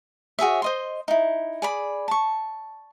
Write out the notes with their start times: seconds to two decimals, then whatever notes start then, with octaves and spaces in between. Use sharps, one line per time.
0.39 F#4 G#4 C#5 E5
0.62 C5 D#5 C6
1.08 D#4 E4
1.62 G#4 D5 B5
2.08 A5 C#6